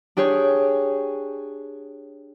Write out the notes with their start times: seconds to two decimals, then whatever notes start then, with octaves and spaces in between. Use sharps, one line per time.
0.17 D4 G4 G#4 C#5 C#6